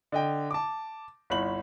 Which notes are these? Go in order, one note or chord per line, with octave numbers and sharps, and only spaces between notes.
D3 D#5 G5
A5 D6
G1 C2 C#5 B5 F#7